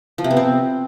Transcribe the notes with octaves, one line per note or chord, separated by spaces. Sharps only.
F3
C3
B3
C4